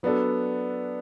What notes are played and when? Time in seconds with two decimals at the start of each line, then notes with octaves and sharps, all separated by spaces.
0.03 F#3 B3 D4 A4